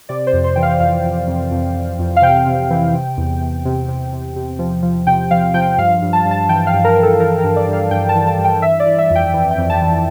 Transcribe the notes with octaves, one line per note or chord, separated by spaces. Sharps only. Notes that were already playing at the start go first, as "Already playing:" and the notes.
C3 D5
C5
F2
C5
E3 G5
F5
F2 F5
F2
F2
F2
F2
F2
F5
C3 G5
C3
E3
C3
E2
E2
C3
C3
C3
C3
F3
F3
C3 G5
F3 F5
F3 G5
G2 F5
G2
A5
G2
A5
E3 G5
F5
G2
A#4
E3
A4
E3 A#4
A#4
G2
D5
G2
F5
G2 G5
A5
E3
A5
G2
G5
E3 E5
D5
E3
E5
F2
G5
E3
G5
F2
A5
E3